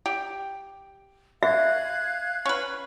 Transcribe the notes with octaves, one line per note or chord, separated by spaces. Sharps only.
G4
E5 F5 F#6 G#6
C#4 B4